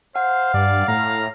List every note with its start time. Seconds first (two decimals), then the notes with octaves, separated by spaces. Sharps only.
0.16 C5 F5 F#5
0.54 G2 D5
0.88 A2 A#5